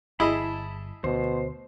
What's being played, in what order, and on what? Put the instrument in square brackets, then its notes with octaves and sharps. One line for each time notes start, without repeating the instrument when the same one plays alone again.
[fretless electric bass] G1 [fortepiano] E4 G#4 D#5 [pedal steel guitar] A5 B5
[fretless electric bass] D2 [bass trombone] B2 [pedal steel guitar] C5